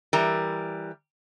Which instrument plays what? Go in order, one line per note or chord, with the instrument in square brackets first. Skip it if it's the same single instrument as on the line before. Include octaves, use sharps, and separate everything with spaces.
[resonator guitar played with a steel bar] E3 G3 A#4